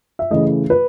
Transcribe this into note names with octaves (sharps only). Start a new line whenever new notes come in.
E5
C#3 E3 A3 D#5
B4